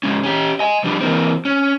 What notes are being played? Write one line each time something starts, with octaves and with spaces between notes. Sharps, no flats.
G#2 D3 G#3 C#4
C#4 G4
D#5 G#5
F3 G3 D4
E3 A#3 C4
C#4